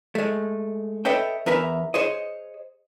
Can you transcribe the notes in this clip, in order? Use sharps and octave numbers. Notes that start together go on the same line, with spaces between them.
G#3 A3
A4 B4 C#5 D#5 E5 G5
E2 A#4 B4 E5 A#5
G#4 C5 C#5 D#5